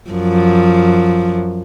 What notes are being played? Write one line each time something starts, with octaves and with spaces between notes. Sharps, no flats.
F#2 F3